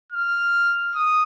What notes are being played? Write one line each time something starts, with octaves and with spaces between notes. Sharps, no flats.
F6
D#6